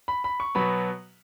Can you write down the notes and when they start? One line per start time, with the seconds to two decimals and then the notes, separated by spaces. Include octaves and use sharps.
0.08 B5
0.24 B5
0.40 C#6
0.55 B2 F#3 B3 B5